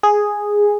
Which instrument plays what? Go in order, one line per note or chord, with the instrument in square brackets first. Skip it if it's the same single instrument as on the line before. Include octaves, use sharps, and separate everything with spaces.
[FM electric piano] G#4